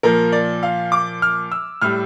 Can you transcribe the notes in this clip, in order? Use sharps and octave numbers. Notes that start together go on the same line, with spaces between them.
A#2 F3 A#4
D5
F5
D6
F6
E6
A2 G3 F6